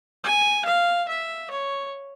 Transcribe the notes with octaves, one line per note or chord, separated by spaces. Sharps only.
G#5
F5
E5
C#5